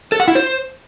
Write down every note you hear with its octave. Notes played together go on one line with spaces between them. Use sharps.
A4
F#5
E4
C5